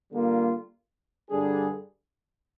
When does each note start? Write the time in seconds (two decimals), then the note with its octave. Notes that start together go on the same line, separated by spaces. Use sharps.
0.11 D3 G3 A#3 F4
1.29 G2 D3 G3 D4 G#4